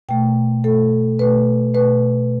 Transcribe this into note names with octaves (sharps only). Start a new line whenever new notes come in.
B2 A3 G5
B2 A3 A4
B2 A3 B4
B2 A3 B4